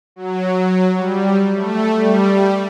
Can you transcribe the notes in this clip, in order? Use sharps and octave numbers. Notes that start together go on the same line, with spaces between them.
F#3
G3
A3
G3